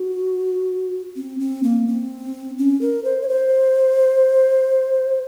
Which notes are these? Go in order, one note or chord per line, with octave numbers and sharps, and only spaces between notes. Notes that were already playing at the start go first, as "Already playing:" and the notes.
Already playing: F#4
C4
C4
A#3
C4
C#4
A#4
C5
C#5
C5